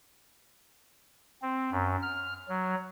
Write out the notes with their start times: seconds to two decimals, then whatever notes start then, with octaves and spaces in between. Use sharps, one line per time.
1.42 C4
1.71 F#2
2.02 F6
2.49 F#3